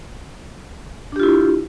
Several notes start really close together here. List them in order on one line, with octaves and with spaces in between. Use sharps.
D4 G4 F4 E4